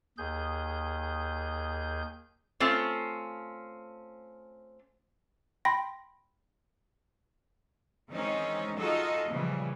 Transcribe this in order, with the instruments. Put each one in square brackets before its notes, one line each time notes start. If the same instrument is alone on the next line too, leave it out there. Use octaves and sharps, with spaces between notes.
[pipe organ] D#2 G#4 G6
[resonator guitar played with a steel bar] A3 C4 C#4 F4
[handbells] G5 B5 C6 A#6
[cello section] D#3 E3 G#3 C4 C#4 D#4
D#4 F4 F#4 G#4 A4 D#5
A#2 C#3 E3 F3 G3